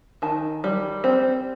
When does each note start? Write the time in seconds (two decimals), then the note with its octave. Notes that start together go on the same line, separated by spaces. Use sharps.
0.22 D#3 A5
0.64 G3
1.04 C4